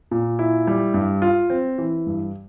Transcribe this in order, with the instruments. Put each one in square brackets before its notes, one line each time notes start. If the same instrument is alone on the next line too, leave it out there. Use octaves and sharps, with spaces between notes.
[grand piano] A#2
E4
G3
G2
F4
C4
E3
G2